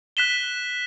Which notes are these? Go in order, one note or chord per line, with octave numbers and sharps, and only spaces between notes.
F#6 B6 E7 G7